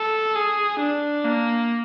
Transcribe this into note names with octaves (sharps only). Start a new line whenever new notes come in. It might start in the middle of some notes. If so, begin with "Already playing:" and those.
Already playing: A4
G#4
D4
A#3